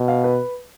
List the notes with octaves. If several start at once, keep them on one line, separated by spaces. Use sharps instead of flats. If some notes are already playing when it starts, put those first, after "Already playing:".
Already playing: B2
F5
B4